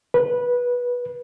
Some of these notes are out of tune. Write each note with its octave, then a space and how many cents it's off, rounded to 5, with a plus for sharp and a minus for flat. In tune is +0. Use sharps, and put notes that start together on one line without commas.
B4 -15